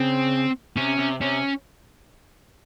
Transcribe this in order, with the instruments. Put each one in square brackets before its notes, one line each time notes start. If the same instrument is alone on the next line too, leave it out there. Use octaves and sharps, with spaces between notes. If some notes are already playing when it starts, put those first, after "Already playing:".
Already playing: [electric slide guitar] C#3 [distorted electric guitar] C4
[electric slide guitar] C3 [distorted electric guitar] C#4
[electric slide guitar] C3
[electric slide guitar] C3 [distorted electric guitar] C#4